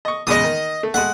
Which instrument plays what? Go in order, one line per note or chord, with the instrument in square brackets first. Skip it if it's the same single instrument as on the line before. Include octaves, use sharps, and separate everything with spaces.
[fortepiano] D#5 C#6
[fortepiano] E2 C#3 G#3 [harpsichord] D#5 D#6
[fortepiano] D#3
A3
[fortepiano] G#3 A3 [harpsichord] F#5